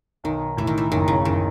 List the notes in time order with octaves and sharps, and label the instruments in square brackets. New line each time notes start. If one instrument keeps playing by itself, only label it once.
[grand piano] B1 [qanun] D#3
[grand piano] A2 [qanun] E3
[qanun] D#3
E3
[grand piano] F#1 [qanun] D#3
[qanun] C#3
[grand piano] F#1 [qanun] D#3